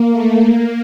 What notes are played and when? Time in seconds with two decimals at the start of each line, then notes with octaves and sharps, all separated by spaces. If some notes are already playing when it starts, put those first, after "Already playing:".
Already playing: A#3
0.11 A3
0.42 A#3